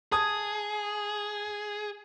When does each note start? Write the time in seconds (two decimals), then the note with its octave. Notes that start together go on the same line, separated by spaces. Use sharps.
0.12 G#4 A5 D#6 G#6